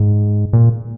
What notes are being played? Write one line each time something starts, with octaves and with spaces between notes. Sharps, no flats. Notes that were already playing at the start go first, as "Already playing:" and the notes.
Already playing: G#2
A#2